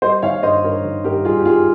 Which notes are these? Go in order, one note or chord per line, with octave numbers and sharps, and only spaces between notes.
G3 C5 D#5
D#3 C#5 F5
G2 C5 D#5
G2 A#4 C#5
D#3
G2 G4 A#4
G3 F4 G#4
G4
G3 F4 G#4